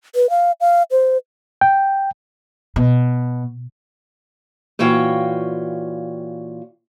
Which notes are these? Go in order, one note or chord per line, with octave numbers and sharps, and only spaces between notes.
B4
F5
F5
C5
G5
B2
A#2 E3 F#4 C#5 F5 G5